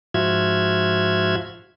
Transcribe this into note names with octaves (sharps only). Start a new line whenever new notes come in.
G#2 F3 F4 F#4 E5 G#6